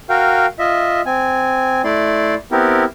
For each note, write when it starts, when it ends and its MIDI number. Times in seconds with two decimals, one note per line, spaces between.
0.09 0.46 66
0.09 0.46 70
0.09 0.46 77
0.09 0.46 79
0.59 1.01 65
0.59 1.01 75
0.59 1.01 76
1.06 1.82 60
1.06 1.82 80
1.84 2.34 57
1.84 2.34 64
1.84 2.34 74
1.84 2.34 84
2.52 2.84 59
2.52 2.84 60
2.52 2.84 64
2.52 2.84 67
2.52 2.84 70